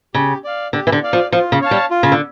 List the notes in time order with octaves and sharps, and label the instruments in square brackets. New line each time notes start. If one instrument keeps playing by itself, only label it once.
[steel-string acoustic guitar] C#3 [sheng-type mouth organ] G4
[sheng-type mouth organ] D5 F5
[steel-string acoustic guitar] D3 [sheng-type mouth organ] G4
[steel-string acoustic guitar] E3
D3
[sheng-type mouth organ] D5 F5
[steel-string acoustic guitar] F3
[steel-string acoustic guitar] F3 [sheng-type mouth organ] F4
[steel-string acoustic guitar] C#3
[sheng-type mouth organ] C#5 F5 A5
[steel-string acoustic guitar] G3
[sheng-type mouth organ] F4
[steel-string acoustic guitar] C#3
D3